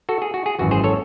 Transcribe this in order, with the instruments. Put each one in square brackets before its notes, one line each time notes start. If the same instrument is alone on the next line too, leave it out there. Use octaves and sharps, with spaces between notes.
[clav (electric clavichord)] F#4 A4
G#4
F#4
G#4
G#1 F#2 E3 F#4
G#4 C5
A4 C#5